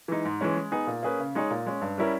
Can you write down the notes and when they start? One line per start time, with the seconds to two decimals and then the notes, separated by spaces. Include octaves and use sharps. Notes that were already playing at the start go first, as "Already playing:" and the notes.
0.08 E3 G#3 D#4
0.25 G#2
0.41 E3 G#3 C#4
0.56 G#3
0.72 B3 D#4 G#4
0.87 A#2
1.03 A#3 C#4 G#4 B4
1.20 C#3
1.35 G#3 D#4 G#4 C#5
1.51 A#2
1.66 G#3 C#4
1.81 G2
1.98 G3 C#4 E4 A#4